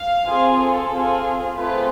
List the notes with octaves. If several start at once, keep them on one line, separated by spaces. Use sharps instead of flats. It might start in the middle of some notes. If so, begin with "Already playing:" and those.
Already playing: F5
C4 F4 G#4
A4
C4 F4 G#4
A3 C4 F4 G#4 B4